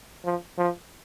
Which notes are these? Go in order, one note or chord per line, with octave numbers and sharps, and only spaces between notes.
F3
F3